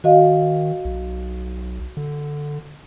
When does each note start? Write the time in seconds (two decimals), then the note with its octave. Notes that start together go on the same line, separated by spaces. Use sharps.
0.04 D#3 F#4 D#5 F5
0.85 B1
1.97 D3